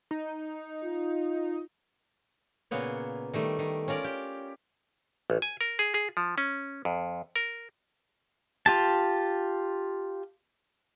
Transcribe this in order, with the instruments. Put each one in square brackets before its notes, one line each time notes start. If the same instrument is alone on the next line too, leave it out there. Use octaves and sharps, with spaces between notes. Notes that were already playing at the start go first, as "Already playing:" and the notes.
[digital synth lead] D#4
[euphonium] F4
[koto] A#2 C#3 A#3 B3 C#5
D#3 G3 A3
D#3
C#4 F4 A#4 D5
G4
[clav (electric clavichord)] A1
G#5
A#4
G#4
G#4
F3
C#4
F2
A#4
[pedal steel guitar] F4 G4 A5